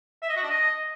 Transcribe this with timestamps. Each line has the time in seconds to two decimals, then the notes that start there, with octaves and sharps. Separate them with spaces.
0.22 E5
0.29 D#5
0.36 F#4
0.43 D4
0.50 D#5